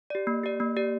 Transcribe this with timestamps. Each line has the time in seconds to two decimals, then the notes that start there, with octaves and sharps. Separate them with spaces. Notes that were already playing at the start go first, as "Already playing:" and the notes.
0.10 G4 D5
0.27 A#3
0.44 G4 D5
0.60 A#3
0.76 G4 D5